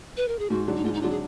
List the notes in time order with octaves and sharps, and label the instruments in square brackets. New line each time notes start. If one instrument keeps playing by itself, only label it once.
[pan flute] B4
A#4
G#4
[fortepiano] G#2 [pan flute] F#4
[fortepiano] F#3 D4
[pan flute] D#4
[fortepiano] G#2 [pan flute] F4
[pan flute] D#4
[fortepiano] F#3 D4 [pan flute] F4
[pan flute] G#4